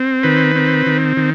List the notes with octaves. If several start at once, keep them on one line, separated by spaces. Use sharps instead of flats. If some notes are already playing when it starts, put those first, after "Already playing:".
Already playing: C4
D#3 B4
C4
D#3
D#3